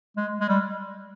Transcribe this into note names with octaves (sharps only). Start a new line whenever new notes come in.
G#3
G#3
G3